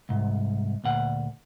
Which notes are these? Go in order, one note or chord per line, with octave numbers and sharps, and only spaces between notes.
C2 G#2
D2 A#2 F#5